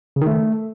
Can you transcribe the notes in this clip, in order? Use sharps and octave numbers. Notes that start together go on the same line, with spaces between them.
C#3
D#3
A3